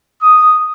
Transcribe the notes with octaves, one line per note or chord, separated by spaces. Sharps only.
D#6